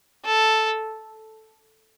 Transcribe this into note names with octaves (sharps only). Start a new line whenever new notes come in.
A4